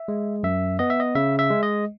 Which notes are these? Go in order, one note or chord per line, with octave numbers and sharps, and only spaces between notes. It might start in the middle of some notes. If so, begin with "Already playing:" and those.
Already playing: E5
G#3
F#2 E5
B3 D#5
E5
D#5
C#3 E5
E5
G#3
D#5